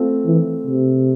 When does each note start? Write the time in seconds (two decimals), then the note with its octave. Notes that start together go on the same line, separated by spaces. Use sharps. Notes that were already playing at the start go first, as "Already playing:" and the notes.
Already playing: A3 C4 F4
0.26 E3
0.67 C3